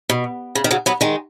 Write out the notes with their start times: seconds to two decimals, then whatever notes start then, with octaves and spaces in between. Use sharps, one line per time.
0.09 B2
0.55 C#3
0.64 D#3
0.71 C#3 F#3
0.86 F#3 B3
1.01 D#3 G#3